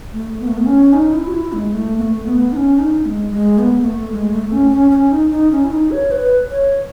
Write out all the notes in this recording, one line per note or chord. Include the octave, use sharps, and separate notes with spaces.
A3
B3
A3
B3
C#4
D#4
E4
F#4
E4
G#3
A3
B3
A3
B3
D#4
C#4
D#4
G#3
G#3
B3
A3
G#3
A3
C#4
C#4
C#4
D#4
D#4
C#4
E4
D#4
C#5
B4
C#5